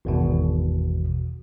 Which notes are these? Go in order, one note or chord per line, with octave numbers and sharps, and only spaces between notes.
G#1 E2 B2